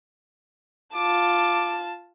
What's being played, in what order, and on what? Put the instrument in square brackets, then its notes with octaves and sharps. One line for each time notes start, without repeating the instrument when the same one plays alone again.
[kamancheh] F4 A5 [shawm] D6